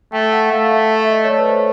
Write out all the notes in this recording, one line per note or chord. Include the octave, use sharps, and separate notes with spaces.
A3 G5
F#5
A3 F5
E5
E5
D#5
C#5
A3 D5
B4
C5